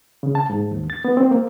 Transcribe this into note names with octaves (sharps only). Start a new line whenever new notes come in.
C#3
A5
G#2
D#2
A6
B3
C4
A#3